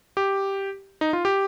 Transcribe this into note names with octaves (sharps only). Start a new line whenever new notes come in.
G4
D#4
F4
G4